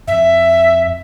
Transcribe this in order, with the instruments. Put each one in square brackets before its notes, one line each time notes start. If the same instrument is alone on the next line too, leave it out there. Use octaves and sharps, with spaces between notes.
[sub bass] F2 [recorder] E5